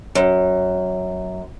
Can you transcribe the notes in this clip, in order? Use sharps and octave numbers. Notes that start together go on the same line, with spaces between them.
F#2